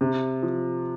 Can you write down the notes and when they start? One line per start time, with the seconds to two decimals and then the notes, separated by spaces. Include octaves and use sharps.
0.01 C3
0.43 F3